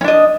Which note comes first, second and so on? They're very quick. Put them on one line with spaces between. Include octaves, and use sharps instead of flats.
C#4 D4 D#5